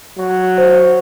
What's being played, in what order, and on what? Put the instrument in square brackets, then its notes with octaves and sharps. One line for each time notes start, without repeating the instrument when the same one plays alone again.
[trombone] F#3
[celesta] C5